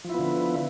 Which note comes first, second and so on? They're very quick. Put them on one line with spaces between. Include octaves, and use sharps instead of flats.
F3 E4 B3 D3